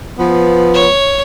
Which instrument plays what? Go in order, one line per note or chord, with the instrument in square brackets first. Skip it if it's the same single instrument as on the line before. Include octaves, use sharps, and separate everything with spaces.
[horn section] F3 B3
[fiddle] C#5